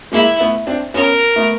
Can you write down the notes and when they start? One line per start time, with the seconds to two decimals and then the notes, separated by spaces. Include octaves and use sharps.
0.12 G#3 A#3 E4
0.40 A3 B3
0.67 C4 D4
0.94 B3 C#4 A#4
1.36 A3 B3